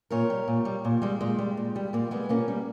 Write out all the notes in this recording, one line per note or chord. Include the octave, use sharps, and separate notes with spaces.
A#2 A#4 C#5
G3
A#2
G3
A#2
G3 G#3
A#2 G#3
G3
A#2
G3
A#2 A#3
G3 G#3 B3
A#2 A#3 C#4
G3